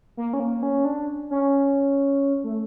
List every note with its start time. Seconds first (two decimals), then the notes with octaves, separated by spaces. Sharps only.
0.17 A#3
0.33 C#4
0.40 A#3
0.63 C#4
0.85 D4
1.31 C#4
2.44 A3